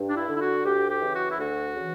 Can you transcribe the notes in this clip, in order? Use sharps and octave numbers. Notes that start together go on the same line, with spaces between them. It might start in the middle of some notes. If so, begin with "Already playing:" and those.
Already playing: G2
D4
E4
D3
E4
F#4
D2 G4
G4
C#3 E3
F#4
E4
D2 F#4
C#3 E3